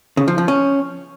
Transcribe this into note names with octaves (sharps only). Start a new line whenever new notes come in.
C#3
F3
F3
C#4